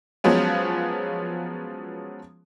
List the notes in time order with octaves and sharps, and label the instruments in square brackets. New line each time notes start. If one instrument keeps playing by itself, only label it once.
[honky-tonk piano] F3 F#3 G#3 B3 C#4